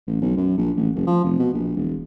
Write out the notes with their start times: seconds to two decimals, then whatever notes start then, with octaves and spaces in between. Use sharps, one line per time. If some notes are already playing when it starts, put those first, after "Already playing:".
0.07 A1
0.21 B1
0.37 F#2
0.58 A#1
0.77 A1
0.95 F#1
1.07 F3
1.24 F1
1.39 B2
1.53 A#1
1.76 E1